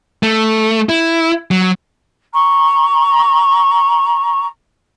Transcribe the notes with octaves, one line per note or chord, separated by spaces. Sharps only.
A3
E4
F#3
A#5 C#6